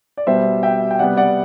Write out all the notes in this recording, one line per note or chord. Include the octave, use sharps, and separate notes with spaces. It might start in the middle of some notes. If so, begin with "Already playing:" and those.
D5
B2 G3 B3 C5 E5
E5 G5
G5
C3 G3 B3 D5 F#5
D5 F#5